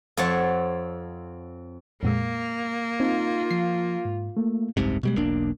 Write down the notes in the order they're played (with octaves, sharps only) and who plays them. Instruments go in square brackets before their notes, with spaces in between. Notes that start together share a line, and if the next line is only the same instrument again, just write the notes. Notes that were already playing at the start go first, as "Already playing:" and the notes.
[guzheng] F2 C4 C#5 F#5 A5
[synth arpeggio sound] F2 A#2 G#3 [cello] A#3
[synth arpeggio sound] C4 [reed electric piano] D#4 [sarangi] F4
[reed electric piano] F3 [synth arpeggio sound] C7
[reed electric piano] G#2
A3 A#3
[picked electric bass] F#1 C2 G#2 C3
B2 G3 G#3
E1 B1 A#3 D4